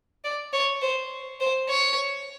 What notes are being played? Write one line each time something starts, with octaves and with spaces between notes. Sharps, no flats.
D5
C#5
C5
C5
C#5